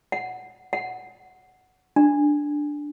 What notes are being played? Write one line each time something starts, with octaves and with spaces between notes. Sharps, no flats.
F#5
F#5
D4